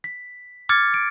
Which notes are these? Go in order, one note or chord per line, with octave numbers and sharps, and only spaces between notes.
B6
D6 F6 G#6 A6 C#7
D7